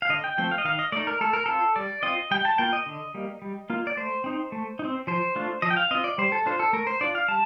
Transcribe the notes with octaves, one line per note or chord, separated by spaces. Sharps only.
F5
D3 D#5
G5
F3 A3 C4 G5
F5
D#5
D#3 F5
D#5
A3 D#4 D5
A#4
A3 A4
A#4
C4 F4 A4
G3 D5
C4 F4 D#5
G3 G5
A5
A#3 F4 G5
D#5
D3
G3 A#3
G3
A#3 F4
D5
A3 C5
C4 D#4
A3
D#4
C4
F3 C5
A3 D4 F4
F3 D#5
G5
F5
C4 F4 D#5
D5
G3 C5
A4
D4 F4 C5
A4
A3 A#4
C5
D4 F4 D5
F5
G3 A5